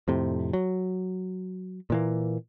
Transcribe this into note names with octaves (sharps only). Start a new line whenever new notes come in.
F2 A2 C3
F#3
A#2 E3 A#3